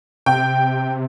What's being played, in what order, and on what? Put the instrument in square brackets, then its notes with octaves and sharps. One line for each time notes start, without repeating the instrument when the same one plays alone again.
[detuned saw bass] C3 [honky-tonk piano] G5